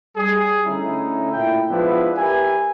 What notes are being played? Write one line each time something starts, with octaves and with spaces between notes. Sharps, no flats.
G3 G#4
D3 A3 C#4 D#4 E4
A#2 A3 E4 G5
F3 G#3 B3 D4 E4 B4
G4 A#4 B4 E5 G#5